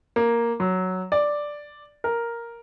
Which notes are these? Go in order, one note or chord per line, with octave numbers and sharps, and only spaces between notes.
A#3
F#3
D5
A#4